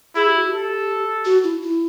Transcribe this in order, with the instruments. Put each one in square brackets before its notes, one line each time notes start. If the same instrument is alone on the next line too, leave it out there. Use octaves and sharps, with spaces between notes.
[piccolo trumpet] E4 [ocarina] G#4
[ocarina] G4
F#4
[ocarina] G4 [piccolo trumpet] A4
[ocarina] F#4
E4
E4